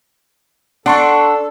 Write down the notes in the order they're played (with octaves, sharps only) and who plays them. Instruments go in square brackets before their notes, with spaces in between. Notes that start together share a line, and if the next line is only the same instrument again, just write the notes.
[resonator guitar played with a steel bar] D4 [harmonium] A4 [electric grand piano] F#5 C6 C#6